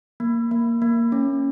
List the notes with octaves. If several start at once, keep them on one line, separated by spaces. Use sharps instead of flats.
A#3
A#3
A#3
C#4